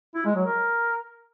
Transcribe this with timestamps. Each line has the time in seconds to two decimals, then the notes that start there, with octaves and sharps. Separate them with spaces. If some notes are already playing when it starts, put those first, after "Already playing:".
0.15 E4
0.25 G#3
0.35 F#3
0.46 A#4